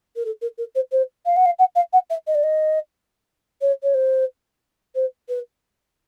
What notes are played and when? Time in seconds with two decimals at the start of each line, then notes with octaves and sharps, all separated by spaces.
0.16 A#4
0.25 A4
0.42 A#4
0.58 A#4
0.75 C5
0.92 C5
1.26 F5
1.36 F#5
1.46 F5
1.59 F#5
1.76 F5
1.93 F#5
2.10 E5
2.27 D#5
2.35 D5
2.43 D#5
3.62 C#5
3.83 C#5
3.94 C5
4.95 C5
5.29 B4